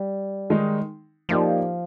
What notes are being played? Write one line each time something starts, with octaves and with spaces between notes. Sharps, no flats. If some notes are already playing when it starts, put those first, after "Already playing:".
Already playing: G3
D#3 G#3 D#4
F3 A#3 D#4 G4 D5